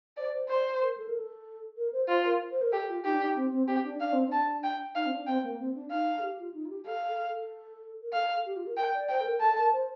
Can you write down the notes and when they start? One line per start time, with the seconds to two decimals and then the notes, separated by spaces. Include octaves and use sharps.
0.17 C5 D5
0.33 C5
0.49 C5 D5
0.81 A#4
0.97 A4
1.08 A#4
1.18 A4
1.77 A#4
1.93 C5
2.08 F4 C5
2.25 A#4
2.51 C5
2.61 A#4
2.72 G4 A4
2.89 F4
3.04 D#4 G4
3.14 D4
3.23 D#4
3.36 C4
3.52 C4
3.68 C4 G4
3.84 D4
4.00 D4 F5
4.13 C4
4.27 D4
4.32 A5
4.63 G5
4.95 D#4 F5
5.06 C4
5.11 D4
5.27 C4 G5
5.43 A#3
5.60 C4
5.75 D4
5.90 D#4 F5
6.18 A4
6.22 G4
6.39 F4
6.54 D#4
6.65 F4
6.70 G4
6.86 A4 F5
7.18 A4
7.35 A4
8.02 A#4
8.13 A4 F5
8.46 G4
8.56 F4
8.67 A#4
8.77 A#4 G5
8.94 D5
9.09 C5 G5
9.21 A4
9.26 A#4
9.41 A4 A5
9.57 A#4
9.73 C5